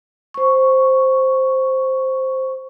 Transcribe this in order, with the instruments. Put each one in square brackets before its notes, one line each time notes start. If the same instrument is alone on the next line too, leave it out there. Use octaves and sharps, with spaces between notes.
[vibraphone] C5 C#6